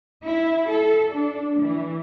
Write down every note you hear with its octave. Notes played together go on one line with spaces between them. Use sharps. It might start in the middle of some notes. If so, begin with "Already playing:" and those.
E4
A4
D4
E3